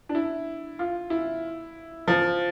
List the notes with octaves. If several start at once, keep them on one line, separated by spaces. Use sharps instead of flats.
D4
E4
F4
E4
F3